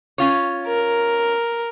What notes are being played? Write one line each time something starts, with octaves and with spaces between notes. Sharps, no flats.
C#4 F4 C#5
A#4